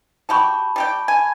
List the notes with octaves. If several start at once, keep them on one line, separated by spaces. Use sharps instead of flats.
F#4 G4 G5 A5 B5 C#6
G3 G4 G5
G#5